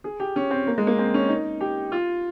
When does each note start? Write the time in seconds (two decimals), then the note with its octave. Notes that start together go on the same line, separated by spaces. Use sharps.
0.04 G#4
0.20 G4
0.36 C#4
0.51 C4
0.67 A#3
0.78 G#3
0.87 A#3
0.99 C4
1.14 C#4
1.29 D#4
1.61 G4
1.92 F4